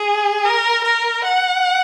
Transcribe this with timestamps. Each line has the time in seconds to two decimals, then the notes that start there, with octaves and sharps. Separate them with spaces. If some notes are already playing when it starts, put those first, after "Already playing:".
Already playing: G#4
0.45 A#4
0.84 A#4
1.24 F#5